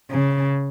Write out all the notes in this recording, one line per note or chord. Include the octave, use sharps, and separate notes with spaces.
C#3